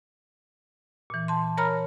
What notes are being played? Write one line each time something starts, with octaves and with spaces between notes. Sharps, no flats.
A#2 E3
A5 C6
A#4 C#5 A#5 B5 F6